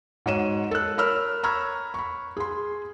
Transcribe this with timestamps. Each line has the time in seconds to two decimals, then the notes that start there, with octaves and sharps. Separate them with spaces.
0.26 G#2 F#4 C#5 D#7 E7
0.71 A4 F#6
0.98 A#4 C#5 B5 E6 F6
1.43 A#5 B5 C#6 E6 F6 G#6
1.94 B5 C#6
2.37 G#4 C6